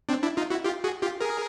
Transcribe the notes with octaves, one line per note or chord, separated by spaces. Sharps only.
C4 D4
D4 E4
D#4 F4
E4 F#4
F4 G4
F#4 G#4
F4 G4
G#4 A#4